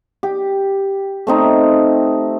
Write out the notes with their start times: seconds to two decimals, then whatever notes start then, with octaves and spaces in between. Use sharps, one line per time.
0.23 G4
1.27 A3 C4 D#4